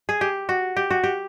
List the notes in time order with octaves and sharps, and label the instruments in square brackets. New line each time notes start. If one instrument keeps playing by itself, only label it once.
[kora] G#4
G4
F#4
G4
F#4
G4